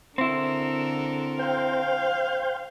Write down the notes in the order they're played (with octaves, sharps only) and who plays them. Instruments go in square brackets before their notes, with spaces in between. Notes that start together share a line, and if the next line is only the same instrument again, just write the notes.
[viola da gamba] D3 A4 A#4 [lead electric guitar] C4 E4
[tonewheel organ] C5 G5 [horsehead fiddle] F5